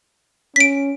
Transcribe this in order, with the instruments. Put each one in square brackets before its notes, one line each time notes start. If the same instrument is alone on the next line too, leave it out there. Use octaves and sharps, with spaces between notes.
[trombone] C#4 [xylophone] B6 D7